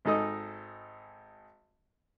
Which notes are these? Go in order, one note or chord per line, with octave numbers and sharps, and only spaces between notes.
G#1 G#3 D#4 A4 D#5 D#6